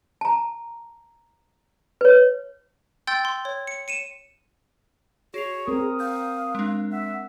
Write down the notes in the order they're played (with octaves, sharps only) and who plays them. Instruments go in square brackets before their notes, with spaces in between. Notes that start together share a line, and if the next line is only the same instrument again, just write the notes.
[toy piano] A5 A#5
B4 C#5
[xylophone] G5 C6 E6 G6 A6
C6
C#5
C#7
C#7 D#7 E7
[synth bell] F#4 C7 F7 [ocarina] G#4 [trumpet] C#5
[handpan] C4 A#4 [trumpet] D#6
[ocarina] F5 [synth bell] G6
[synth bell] G#3 D4
[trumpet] E5 [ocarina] F#5